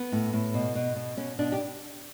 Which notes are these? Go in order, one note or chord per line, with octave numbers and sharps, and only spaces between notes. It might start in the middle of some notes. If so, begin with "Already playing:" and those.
Already playing: B3
A2
A2
B2
B2
B2
B2 C#4
B2 D4
G4